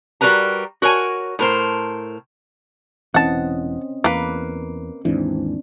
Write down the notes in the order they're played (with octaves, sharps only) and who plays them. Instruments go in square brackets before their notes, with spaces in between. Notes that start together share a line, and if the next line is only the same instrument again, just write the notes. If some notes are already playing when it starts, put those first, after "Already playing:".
[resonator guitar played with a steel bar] G3 F#4 A#4 B4 A#5
F#4 A#4 C#5 G#5
A2 A#4 C5
[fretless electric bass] E1 E3 [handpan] C4 C#4 D#5 [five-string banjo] F#5 A5
[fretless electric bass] E2 [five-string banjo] A#3 B4
[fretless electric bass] D#2 G#2 E3 [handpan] C4 D4